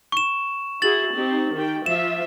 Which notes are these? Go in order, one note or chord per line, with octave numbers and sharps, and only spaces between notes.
C#6 E7
E4 F#4 G#4 A6 F#7
C4 D#4 G4
D#3 G4 G5
F3 F4 E5 E7